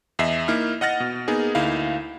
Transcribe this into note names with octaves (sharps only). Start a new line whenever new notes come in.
E2 D#5 E5 C7
A#3 D#4 E4 F6
D#5 F#5 F6 A6 A#6
B2
A#3 B3 D#4 G#4
D2 A#3 D#4 E4 F5